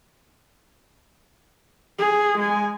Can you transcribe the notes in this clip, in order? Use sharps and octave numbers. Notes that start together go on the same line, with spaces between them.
G#4
G#3 G#5